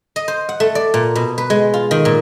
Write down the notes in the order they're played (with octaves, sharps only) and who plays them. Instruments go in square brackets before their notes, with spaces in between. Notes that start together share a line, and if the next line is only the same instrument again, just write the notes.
[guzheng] D#5
C5
F#5
A3
D5
A#2
B2
B4
G#3
F4
D#3
A#2